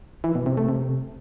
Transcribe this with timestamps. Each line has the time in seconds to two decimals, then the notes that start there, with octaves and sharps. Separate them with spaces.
0.24 E3
0.35 B2
0.46 C3
0.57 A3
0.69 C3